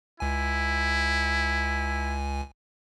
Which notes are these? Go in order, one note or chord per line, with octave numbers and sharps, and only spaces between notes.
C#2 E4 G#5